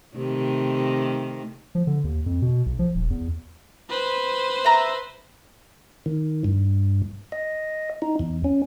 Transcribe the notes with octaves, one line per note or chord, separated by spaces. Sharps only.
C3 D#3 A3
F3
D3
D#2
F2
B2
B1
F3
D#1
E2
B4 C5
E5 A#5
D#3
G2
D#5
D#4
E2
C#4